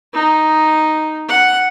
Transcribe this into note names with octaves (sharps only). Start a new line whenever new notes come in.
D#4
F#5